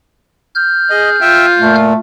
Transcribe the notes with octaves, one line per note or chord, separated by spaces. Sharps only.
F6 G6
G#4 D#5
F4 E5 G5
A#2 A3